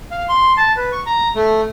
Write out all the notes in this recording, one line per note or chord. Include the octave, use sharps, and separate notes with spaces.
F5
C6
A5
B4
C#6
A#5
A3